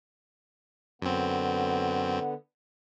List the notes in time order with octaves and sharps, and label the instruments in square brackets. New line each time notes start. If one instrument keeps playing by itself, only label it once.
[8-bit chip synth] F#2 C4 [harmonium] D3 B3